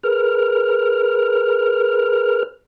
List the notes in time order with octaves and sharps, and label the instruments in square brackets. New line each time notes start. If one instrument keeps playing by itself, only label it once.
[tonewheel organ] G#4 A#4 B4 F6